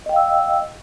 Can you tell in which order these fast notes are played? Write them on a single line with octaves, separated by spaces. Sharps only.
D#5 G5 F5 E6